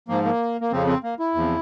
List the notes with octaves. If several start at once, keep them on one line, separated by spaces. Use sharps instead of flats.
G#2 F3 A#3
A#3
A#3
F2 C#3 F3 C4
C4
A#3
E4
E2 C3 F3